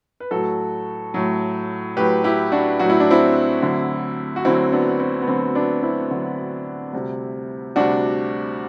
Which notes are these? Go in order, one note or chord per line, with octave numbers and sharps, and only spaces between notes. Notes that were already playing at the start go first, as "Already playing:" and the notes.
B4
A2 F#3 F#4 A4
A2 F#3
A2 F#3 G4 B4
E4 G4
D4 F#4
A2 F#3 F#4
E4
D4
C4 E4
D2 D3 F#3
F#4
D2 D3 F#3 C4 E4
B3 D4
C4
B3
D2 D3 F#3 C4
B3 D4
C4 E4
D2 D3 F#3
D2 C3 G3
D2 C3 G3 D4 F#4